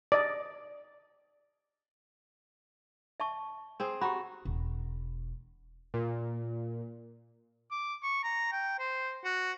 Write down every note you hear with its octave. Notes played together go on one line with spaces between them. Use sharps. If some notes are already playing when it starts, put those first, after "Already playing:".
D5 D#5
E5 A5 C#6
C4 G#4 C5
F#4 G4 A#5 B5
E1
A#2
D6
C#6
A#5
G5
C5
F#4